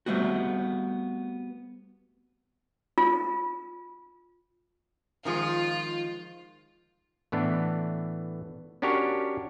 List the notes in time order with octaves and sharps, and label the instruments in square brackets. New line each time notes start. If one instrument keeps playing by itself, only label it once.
[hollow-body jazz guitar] G3 A3 B3 C4 F#4
[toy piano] F4
[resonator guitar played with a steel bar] D#3 F3 G#3 [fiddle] F4
[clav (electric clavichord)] A2 E3 B3 D4
C#4 D4 F#4 G4 A#4 C#5